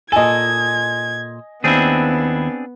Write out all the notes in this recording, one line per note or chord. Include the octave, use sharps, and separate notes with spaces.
A#2 A4 D#5 G#5 G#6
D#2 B3 C4 D4 E4 G#4